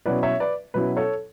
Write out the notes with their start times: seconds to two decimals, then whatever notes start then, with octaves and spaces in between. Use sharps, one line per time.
0.06 B2 F#3 C#4 E4 B4 D5
0.23 C#5 E5
0.40 B4 D5
0.74 B2 F#3 C#4 E4 B4
0.97 A4 C#5